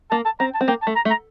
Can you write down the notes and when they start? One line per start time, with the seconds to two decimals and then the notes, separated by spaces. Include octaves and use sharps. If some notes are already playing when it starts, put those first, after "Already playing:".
0.11 A#3 A5
0.25 A5
0.40 C4 A#5
0.54 A5
0.61 C4
0.68 A#3 G5
0.82 A5
0.87 A3
0.96 A#5
1.05 A3
1.10 A#5